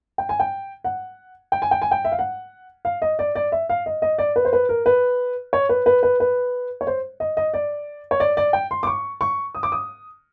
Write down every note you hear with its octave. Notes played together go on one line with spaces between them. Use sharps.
G5
G#5
G5
F#5
G5
G#5
G5
G#5
G5
E5
F5
F#5
F5
D#5
D5
D5
E5
F5
D#5
D#5
D5
B4
C5
B4
A#4
B4
C#5
B4
B4
B4
B4
C#5
C5
D#5
D#5
D5
C#5
D5
D5
G5
C6
D6
C#6
C#6
D#6
D6
D#6